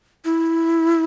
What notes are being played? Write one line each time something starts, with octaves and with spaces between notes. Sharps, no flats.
E4